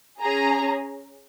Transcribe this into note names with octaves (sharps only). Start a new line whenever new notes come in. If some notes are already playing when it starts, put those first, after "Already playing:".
C#4 G#4 A#5